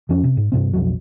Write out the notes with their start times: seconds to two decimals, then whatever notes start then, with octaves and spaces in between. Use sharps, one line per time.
0.09 F2 F3 C#4
0.24 C3
0.37 G#2
0.52 G2 C3 C4
0.74 B1 F2 F#3